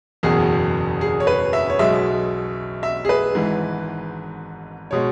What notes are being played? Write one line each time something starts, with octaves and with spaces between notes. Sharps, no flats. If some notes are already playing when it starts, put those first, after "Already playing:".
F#1 E2 B2 G#4
G#4
C#5
B4
E5
C#5
B1 B2 G#3 E5
E5
G#4
B4
G#1 G#2 E3
B2 G#3 C#5